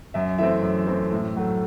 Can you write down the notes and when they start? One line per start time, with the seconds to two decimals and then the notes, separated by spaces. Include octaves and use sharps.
0.14 F#2 E5
0.38 E3 A3 C4 E5
0.62 F#2
0.87 E3 A3 C4
1.12 A2
1.36 F#3 A3